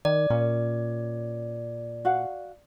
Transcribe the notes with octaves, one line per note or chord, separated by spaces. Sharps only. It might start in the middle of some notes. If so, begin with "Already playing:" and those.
D#3 D5
A#2 C#4
F#4 F5 F#5